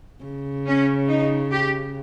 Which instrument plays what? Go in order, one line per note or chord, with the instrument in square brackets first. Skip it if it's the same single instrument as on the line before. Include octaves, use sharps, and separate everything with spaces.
[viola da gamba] C#3
[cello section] C#4
D#4
G4